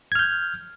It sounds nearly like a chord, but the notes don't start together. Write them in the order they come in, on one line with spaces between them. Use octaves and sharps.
G#6 F6 G6